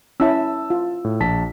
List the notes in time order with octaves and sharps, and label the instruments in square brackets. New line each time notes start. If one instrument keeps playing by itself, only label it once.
[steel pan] C#4 E4 E5 [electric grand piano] A5 E6
[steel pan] F4
[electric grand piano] A2
A#1 A5 B6